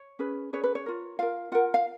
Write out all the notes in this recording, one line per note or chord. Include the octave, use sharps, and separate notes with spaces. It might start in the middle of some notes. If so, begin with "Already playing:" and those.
Already playing: C#5
C#4 G#4 B4
C#4 G#4 B4 C#5
B4
C#5
F4 A#4
F4 A#4 F5
F4 A#4 F#5
F5